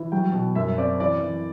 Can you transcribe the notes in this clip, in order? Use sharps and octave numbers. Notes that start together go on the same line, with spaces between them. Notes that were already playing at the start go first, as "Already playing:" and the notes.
Already playing: E3
F#3 G5
B2
F#2 E5
C4 D5
E3 D5
E3